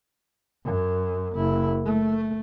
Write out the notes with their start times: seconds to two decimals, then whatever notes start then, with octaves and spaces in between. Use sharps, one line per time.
0.64 F#2
1.36 F#1 E4
1.85 A3